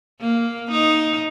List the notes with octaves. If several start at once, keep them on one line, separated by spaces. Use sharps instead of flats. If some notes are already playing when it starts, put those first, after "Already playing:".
A#3
D#4